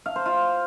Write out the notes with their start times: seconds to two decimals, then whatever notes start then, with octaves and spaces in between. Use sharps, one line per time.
0.06 F5
0.16 C5
0.26 F4